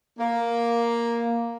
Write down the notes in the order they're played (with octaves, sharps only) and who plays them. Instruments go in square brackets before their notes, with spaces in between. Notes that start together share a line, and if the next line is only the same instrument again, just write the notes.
[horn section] A#3